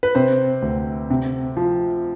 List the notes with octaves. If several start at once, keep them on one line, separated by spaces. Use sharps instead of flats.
B4
C3 C5
D2
C3
F3